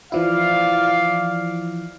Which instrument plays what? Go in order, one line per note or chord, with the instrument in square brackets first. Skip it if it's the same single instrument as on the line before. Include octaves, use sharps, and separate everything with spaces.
[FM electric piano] E3 F3 E4 [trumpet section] D5 F5